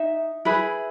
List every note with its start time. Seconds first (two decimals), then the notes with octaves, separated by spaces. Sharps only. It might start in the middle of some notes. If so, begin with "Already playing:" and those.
Already playing: D#4 E5
0.45 E4 G#4 B4